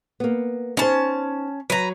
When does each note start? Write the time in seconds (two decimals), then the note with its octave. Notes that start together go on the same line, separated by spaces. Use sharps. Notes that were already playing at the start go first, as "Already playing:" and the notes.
0.20 A#3 B3
0.77 C#4 D#4 C5 A5
1.70 F#3 B4 A#5